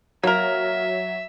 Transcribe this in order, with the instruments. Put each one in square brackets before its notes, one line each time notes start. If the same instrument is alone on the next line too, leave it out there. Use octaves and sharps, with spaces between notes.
[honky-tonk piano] F#3 [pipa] A#3 A#4 [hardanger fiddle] E5